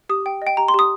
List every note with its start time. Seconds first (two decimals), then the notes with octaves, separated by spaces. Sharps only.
0.09 G4 D#6
0.26 G5
0.42 D#5 G5
0.57 G4 A#5
0.68 C6
0.74 G4 D#6